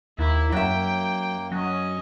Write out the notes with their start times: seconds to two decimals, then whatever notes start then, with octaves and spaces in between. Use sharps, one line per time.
0.19 D#2 A#3 E4
0.52 F#2 F#3 E5 G5
1.52 F#3 C#4 D#5